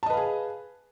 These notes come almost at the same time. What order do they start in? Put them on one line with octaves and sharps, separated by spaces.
A5 D#5 B4 F5 G#4